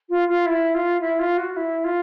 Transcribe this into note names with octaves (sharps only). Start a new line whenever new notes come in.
F4
F4
E4
F4
E4
F4
F#4
E4
F4